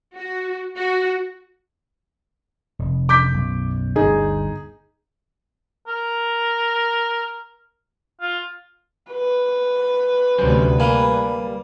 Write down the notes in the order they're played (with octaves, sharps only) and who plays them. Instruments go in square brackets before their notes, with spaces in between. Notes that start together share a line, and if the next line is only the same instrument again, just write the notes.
[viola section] F#4
F#4
[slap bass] F1
[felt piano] D6 G6 B6
[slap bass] B1 F#2
[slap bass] G1 D2 D3 [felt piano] D#4 G#4
[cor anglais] A#4
F4
[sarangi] B4
[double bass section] D2 C3 [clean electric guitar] F#3 C#4 C5
[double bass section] G3 [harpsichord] A#3 [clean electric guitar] G#5 B5